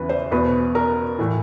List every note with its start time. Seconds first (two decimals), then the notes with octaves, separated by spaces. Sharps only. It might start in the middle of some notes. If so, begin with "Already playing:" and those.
Already playing: E2 C#3 E3 B4
0.09 C5
0.31 E2 B2 B4
0.75 A#4
1.19 A2 E3